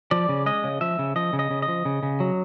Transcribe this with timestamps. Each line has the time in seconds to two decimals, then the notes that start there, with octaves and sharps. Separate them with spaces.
0.11 F3 D5
0.29 C#3
0.46 G#3 D#5
0.64 C#3
0.81 F3 E5
0.99 C#3
1.16 F3 D#5
1.33 C#3
1.39 D#5
1.51 C#3
1.62 D#5
1.68 F3
1.85 C#3
2.03 C#3
2.20 F#3